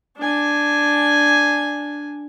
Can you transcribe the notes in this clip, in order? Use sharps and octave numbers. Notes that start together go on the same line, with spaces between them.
D4 G#5